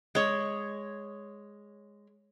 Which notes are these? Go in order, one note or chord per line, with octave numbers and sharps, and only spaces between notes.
G#3 C#5